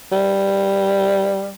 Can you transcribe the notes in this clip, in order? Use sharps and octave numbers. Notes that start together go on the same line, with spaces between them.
G3